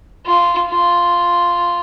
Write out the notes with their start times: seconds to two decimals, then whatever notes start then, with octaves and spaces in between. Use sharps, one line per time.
0.26 F4
0.69 F4